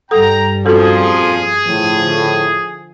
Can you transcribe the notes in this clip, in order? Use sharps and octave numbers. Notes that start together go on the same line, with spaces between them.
G2 G3 A4 F#5 G5 A#5 D#6
F2 A#2 F3 C#4 F#4 G#4 A4
A2 D3 F3